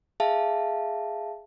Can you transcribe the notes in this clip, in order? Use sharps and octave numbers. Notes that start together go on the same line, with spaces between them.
G#4 E5 F5 A5